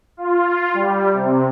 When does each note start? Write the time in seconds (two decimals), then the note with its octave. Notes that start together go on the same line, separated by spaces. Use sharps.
0.17 F4
0.74 G3
1.13 C3